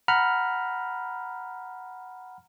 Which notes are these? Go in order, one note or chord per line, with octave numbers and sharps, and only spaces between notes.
F#5 A#5 B5 F6